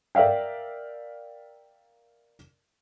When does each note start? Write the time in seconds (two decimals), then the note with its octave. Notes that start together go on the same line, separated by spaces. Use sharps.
0.15 A#4 D5 E5 F5 G5